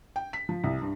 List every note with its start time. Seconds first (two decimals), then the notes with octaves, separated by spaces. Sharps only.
0.16 G5
0.33 B6
0.49 F3
0.64 C2
0.82 G2